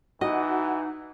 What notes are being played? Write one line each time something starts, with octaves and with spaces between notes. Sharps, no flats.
E3 D#4 F#4 D#5